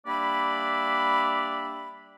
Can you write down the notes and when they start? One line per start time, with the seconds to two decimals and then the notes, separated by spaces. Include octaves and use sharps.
0.07 G3 A#3 D4 D5 E5 B5